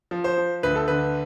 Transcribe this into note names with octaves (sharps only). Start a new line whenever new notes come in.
F3
C5
F3
D2 B4
A4
D3 B4